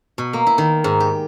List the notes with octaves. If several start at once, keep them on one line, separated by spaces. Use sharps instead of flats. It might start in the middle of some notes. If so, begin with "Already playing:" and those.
B2
A#3
E4
D#3
G#2
G4